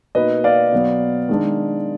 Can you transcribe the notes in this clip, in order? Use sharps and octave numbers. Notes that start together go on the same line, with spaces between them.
B2 A#3 D#4 B4 D#5
D5 F5
B2 F#3 B3
D#3 G#3 D4